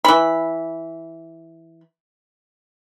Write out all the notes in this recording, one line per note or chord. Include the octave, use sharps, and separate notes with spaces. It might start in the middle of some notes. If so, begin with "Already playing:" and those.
E3 B5